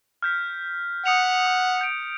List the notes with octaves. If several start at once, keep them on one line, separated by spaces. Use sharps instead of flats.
F6 G6 B6
F#5 D#6 C#7 F7
D#6
G6 D7